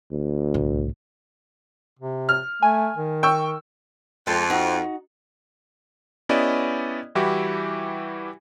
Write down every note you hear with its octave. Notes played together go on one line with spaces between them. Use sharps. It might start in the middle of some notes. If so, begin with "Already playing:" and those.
D2
C2 A2
C3
F6
A3 G#5
D#3
G5 C#6 E6
F2 G#3 A5
D#4 F#4
B3 C#4 E4 G4 D5 D#5
E3 G3 E4 F#4 G4